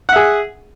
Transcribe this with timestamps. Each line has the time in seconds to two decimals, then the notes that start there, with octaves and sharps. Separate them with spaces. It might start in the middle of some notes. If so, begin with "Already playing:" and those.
0.09 F#5
0.12 E5
0.16 G#4